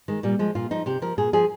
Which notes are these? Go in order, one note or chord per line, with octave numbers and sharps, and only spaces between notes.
D#3 G#3
A#2 G3
F3 G#3
A#2 F4
F3 D#4
C3 G4
F3 A#4
A#2 G#4
F3 G#4